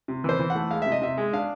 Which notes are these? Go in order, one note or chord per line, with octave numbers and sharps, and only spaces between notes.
C3
E3 C5
E3
F#5
A3
G#3 F5
C3 E5
D#5
C3 E5
G#3
D4 F5